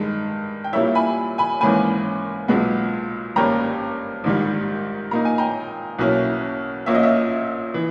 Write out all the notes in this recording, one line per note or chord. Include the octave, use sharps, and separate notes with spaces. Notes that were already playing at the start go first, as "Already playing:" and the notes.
Already playing: G2 D#3 G#3
G5
A#2 G3 A#3 E4 C#5 E5
G#5 B5
G#5 B5
G#1 G#2 E3 A#3 C#4 G#5 B5
B1 A#2 G#3 B3
G#1 G2 G3 A#3 C#4 G5 A#5
A#1 G#2 D#3 G3
A#2 A#3 D#4 A#5
G#5
G5 A#5
B1 B2 A#3 C#4 E4
A#1 A#2 A#3 C#4 E5
D#5
C#5 E5
E3